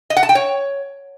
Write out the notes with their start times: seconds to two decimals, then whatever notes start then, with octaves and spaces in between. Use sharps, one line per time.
0.10 D#5
0.17 F#5
0.23 A5
0.29 G5
0.35 C#5